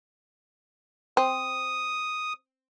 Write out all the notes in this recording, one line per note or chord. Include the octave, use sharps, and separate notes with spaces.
C4 D#6